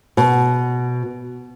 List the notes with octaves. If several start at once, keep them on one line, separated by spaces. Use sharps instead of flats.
B2